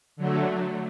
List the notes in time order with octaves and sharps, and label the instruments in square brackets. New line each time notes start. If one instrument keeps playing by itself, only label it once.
[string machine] D3 F#3 A3